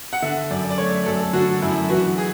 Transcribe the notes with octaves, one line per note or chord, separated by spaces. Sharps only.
F#5
D3 E5
F#2 D5
D5
A3 C#5
F#2 A4
D3 F#4
F#2 E4
E3 F#4
G#4